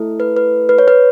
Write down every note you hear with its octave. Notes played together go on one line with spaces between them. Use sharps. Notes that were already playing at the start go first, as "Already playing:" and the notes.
Already playing: A3 E4 A4
B4
B4
B4
C#5
B4